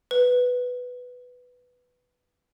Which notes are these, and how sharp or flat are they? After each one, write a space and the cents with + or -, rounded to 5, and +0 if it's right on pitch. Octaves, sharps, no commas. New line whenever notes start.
B4 +5